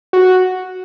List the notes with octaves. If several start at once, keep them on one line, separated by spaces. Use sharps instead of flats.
F#4